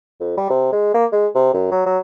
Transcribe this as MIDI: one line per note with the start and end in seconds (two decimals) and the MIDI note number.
0.20 0.37 41
0.38 0.45 55
0.50 0.70 48
0.72 0.90 56
0.94 1.06 58
1.12 1.27 56
1.35 1.52 48
1.53 1.71 42
1.71 1.86 54
1.86 1.98 54